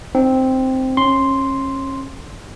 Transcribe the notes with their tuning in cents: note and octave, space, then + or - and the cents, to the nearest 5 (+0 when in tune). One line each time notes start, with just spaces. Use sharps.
C4 +0 D#4 -35
C#4 -30 C6 +0